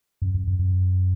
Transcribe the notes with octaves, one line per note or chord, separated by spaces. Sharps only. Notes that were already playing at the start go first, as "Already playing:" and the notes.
F#2
F#2
F#2
F#2